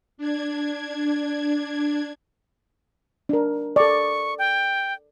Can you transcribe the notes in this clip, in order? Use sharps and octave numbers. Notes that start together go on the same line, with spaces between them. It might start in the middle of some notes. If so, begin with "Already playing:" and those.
D4 G#6
D4 A#4
A4 D5 C#6
G5